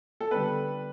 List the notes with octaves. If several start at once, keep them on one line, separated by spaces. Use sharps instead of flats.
A4
D3 G3 B3 B4